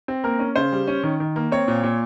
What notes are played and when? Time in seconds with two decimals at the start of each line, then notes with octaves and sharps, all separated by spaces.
0.08 C4
0.24 A#3 A#4
0.39 C#4
0.56 C#3 C5
0.72 G3
0.88 C#4
1.03 D#3
1.20 D#3
1.36 A#3
1.52 C4 C#5
1.68 A#2
1.84 A#2